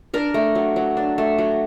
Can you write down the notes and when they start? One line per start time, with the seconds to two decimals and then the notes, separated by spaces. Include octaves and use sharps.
0.14 D4 A#4
0.34 A3
0.55 F#3
0.76 F#3
0.97 D4
1.18 A3
1.38 F#3